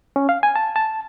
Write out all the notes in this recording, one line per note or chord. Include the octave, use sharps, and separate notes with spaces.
C#4
F5
G#5
A5
A5